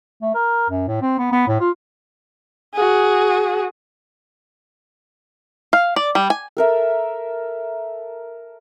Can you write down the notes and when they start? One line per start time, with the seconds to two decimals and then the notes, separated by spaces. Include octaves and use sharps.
0.22 A3
0.34 A#4
0.70 F#2
0.88 A2
1.01 C4
1.18 B3
1.32 B3
1.47 A2
1.61 F4
2.74 F#4 G#4
5.73 F5
5.96 D5
6.15 G3
6.30 G#5
6.57 A4 A#4 E5